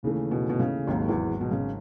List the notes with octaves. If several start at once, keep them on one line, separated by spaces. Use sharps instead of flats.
D#2 C#3 E3 A3
B2
B2
C#3
G#1 D#2 G#2 D#3 F#3
E2 E3
B2
C#3